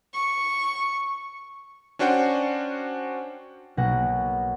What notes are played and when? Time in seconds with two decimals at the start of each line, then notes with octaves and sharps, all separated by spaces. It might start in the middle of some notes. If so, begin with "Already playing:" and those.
0.13 C#6
1.99 C#4 D4 F#4 C5 F#5 G5
3.77 B1 B2 A#3 F#5 A#6